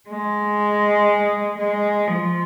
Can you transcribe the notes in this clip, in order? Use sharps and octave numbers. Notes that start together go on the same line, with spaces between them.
G#3
G#3
F3